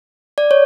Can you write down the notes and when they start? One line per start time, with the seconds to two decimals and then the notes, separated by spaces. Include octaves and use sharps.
0.38 D5
0.51 C#5